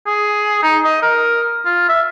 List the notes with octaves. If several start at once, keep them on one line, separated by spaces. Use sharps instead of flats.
G#4
D#4
D#5
A#4
F4
E5